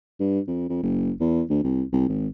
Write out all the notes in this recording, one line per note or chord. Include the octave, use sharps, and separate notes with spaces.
G2
F2
F2
F#1
E2
D2
C2
C2
G#1